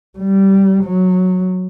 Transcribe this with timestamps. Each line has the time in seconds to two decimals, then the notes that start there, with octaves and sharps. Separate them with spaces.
0.18 G3
0.84 F#3